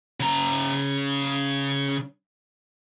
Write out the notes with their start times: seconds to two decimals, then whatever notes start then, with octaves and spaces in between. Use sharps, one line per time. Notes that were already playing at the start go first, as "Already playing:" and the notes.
0.20 C#3 A#5